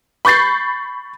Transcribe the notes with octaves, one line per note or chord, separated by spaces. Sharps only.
B5 C#6 G6 A6 C7